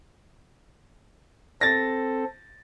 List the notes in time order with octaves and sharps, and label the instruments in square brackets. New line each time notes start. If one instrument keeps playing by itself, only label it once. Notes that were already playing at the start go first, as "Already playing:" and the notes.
[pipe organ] C4 A4 [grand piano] A6 A#6